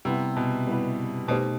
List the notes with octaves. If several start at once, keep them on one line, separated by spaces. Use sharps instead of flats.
C3 G3 B3 E4 B4
B2
G3 B3 E4 B4
B2 A3 D#4 G4 C5